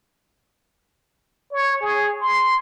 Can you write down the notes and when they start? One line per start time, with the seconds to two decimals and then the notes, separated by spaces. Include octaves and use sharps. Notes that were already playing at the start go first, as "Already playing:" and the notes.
1.52 C#5
1.81 G#4
2.21 C6